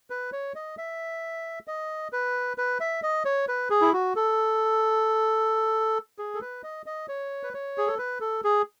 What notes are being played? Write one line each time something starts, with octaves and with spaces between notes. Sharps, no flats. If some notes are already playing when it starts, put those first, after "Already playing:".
B4
C#5
D#5
E5
D#5
B4
B4
E5
D#5
C#5
B4
G#4
E4
F#4
A4
G#4
A4
B4
D#5
D#5
C#5
B4
C#5
G#4
A4
B4
A4
G#4